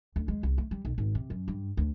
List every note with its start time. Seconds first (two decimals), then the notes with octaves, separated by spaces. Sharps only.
0.16 D2
0.28 G#3
0.43 C2
0.58 A3
0.71 G3
0.85 B1
0.98 G#1
1.15 C3
1.30 F#2
1.48 G2
1.77 D2